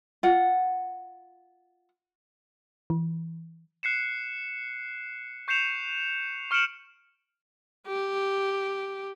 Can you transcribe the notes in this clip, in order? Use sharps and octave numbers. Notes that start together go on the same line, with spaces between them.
F4 F#5
E3
F#6 C7 C#7 E7
C#6 G6 C7 C#7 E7 F7
C#6 F6 C#7 D7 E7 F#7
G4